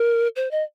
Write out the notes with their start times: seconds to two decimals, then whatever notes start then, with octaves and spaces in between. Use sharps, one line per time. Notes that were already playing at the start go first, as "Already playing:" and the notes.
Already playing: A#4
0.36 C5
0.51 D#5